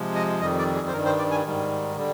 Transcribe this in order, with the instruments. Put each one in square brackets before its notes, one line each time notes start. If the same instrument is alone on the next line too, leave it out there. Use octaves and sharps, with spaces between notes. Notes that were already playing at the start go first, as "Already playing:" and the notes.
Already playing: [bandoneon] C3 F3 G#3
D#5
F2 D#3 G3 D#5
D5
G#4
C5
G2 D#3 G3 A#4
C5
D5
G#5
G#2 D#3 G3
D3 G3